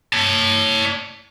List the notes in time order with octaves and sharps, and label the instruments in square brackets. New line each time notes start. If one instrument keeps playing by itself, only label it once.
[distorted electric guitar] C#5 A5